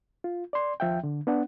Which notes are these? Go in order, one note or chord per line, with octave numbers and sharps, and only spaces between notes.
F4
D5 C6
D#2 F3 E5 G5
D3
B3 D4 F#5